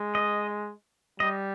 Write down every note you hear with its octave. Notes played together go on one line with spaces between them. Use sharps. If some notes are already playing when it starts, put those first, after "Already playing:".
Already playing: G#3
D#5
G3 D#5